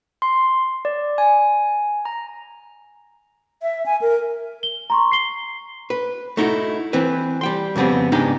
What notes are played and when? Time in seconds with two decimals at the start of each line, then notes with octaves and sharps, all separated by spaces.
0.22 C6
0.85 D5
1.18 G#5
2.05 A#5
3.62 E5
3.86 G#5
4.01 A#4
4.63 G7
4.90 A#5 C6 C#6
5.12 C7 G7
5.90 B4
6.37 A3 D#4 E4 F#4
6.93 E3 C4 B4
7.41 G3 G5 C6
7.76 F2 C#3 G3 B3 C4
8.12 G#2 C#3 B3 D4 D#4 G4